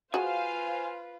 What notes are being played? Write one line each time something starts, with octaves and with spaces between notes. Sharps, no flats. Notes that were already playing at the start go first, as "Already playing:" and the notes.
F4 F#4 G#4 B4 C5 F5 G#5